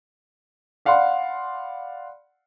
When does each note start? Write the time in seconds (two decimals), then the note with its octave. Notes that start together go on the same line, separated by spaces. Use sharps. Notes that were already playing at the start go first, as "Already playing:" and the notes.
0.85 D5 F5 F#5 B5 C6